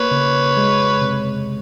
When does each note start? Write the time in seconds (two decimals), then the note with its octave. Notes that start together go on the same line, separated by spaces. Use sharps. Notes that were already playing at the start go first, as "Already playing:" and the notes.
Already playing: A#3 B4 C#5
0.11 C#3
0.57 G#3
1.02 C3